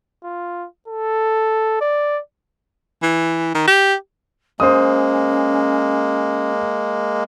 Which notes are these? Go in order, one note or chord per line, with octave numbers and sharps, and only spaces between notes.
F4
A4
D5
E3
D#3
G4
G#3 A#3 C#4 C5 D#6